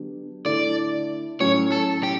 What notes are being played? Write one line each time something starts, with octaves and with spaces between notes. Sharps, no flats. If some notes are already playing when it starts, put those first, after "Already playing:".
Already playing: D3 F#3 B3 D4 G4
D3 A3 E4 D5
A2 F#3 C#4 C#5
A4
G4